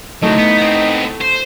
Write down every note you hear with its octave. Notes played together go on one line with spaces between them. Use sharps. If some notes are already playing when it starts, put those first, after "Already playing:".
D3 F#3 A3 D#4 E4
B3
B3 C4
C5